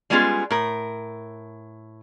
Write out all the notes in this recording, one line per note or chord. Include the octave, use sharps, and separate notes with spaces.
G3 G#3 B3 C#4 F4 G#4
A2 A#4